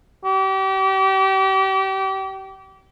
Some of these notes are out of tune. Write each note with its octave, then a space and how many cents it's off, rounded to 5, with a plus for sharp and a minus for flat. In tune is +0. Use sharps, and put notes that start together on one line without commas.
G4 -35